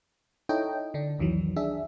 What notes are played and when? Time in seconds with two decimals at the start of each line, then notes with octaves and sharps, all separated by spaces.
0.49 D#4 E4 A4 C#5 D#5 G5
0.94 D3 D4
1.19 C2 F2 D#3 E3 F#3
1.56 D4 G#4 E5